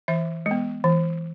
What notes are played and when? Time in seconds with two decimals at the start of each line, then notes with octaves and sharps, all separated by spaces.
0.08 E3 E5
0.46 G#3
0.51 B3
0.84 E3